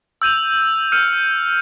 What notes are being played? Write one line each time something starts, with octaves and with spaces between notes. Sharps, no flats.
E6 G6 D#7 F7
E6 F6 G6 C#7 D#7